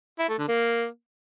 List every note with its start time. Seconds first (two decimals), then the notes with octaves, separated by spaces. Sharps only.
0.19 E4
0.29 A3
0.38 D3
0.48 A#3